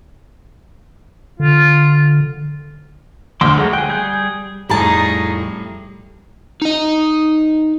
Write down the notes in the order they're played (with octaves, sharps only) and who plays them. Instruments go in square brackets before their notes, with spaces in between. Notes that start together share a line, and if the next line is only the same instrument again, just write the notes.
[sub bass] D3 [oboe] F4
[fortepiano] D2 F6 [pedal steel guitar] C6 D6 E6
[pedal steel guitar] F#3 A3 F#4 [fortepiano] G#3
[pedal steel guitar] G#4 G5 [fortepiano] F#6
[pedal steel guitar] G3 G#4 G6
[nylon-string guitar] F2 A2 A5 [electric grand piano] G3 A3 [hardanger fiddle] D#4 G#4 [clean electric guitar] A#5
[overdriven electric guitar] D#4 D#5